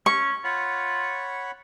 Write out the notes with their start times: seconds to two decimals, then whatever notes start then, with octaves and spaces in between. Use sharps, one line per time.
0.06 C#4 C#6
0.44 F4 C#5 F#5 B5